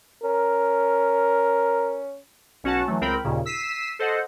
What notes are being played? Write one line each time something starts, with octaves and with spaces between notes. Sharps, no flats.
C#4 A#4
B1 C#4 F#4 F#5 A5
E3 F#3 A3
C#2 C4 A#4 G5 B5
D#2 A#2 C#3
E6 B6 C7 D#7 E7
A4 C5 D#5 F#5